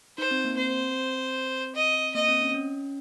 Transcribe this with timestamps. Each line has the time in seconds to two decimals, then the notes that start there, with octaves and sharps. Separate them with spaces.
0.18 D#4 C5
0.31 C4
0.45 A#3
0.57 C4 C5
1.75 D#5
2.15 A#3 D#5
2.28 C4
2.41 C#4
2.54 C#4